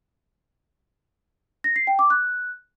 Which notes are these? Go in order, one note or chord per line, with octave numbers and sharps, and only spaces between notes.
A#6
C7
G5
D6
F#6